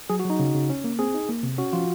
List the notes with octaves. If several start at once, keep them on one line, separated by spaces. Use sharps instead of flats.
F#3 G#4
F#4
F#3 D#4
C#3
C#3
C#4
A#3
C4 G#4
D#4
A#3
C3
C#4 F#4
F3 F4